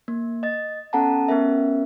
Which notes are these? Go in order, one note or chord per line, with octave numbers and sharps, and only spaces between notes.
A#3
D#5 A6
B3 C#4 A4 F#5 A5 A#5
B3 C#4 A#4 E5